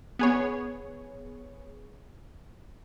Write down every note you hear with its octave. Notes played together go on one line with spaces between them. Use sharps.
B3 G#4 C#5